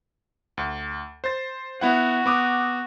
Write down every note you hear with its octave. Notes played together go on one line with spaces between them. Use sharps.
D2
C5 A6
B3 E4 F#4 F#5
B3 D6 D#6